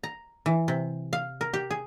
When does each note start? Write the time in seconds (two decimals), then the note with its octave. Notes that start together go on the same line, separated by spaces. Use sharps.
0.04 A#5
0.46 E3
0.68 C3
1.13 F5
1.41 A#4
1.54 G4
1.71 G#4